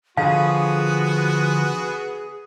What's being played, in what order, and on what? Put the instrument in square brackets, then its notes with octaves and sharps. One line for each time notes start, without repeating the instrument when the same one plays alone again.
[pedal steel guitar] D3 F3 [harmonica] B3 F#4 [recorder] G#4 [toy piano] F5